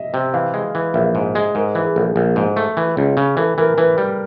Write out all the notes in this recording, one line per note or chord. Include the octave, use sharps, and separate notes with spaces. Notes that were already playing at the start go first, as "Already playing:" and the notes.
Already playing: D#5 E5
C3
E3 F5
G#3
E3
A#1 E5
G#2
G#3
G#2 A#4
E3
G#4
A#1 A4
A#1
G#2
A3
E3
C#2
C#3
E3 A4
E3 A#4
E3 B4
G3